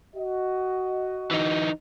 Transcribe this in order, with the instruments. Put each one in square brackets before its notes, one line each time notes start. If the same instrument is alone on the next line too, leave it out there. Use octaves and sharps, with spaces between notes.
[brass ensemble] F#4 D#5
[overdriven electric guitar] E3 D#4